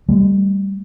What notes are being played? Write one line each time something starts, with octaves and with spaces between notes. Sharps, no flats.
G3 A3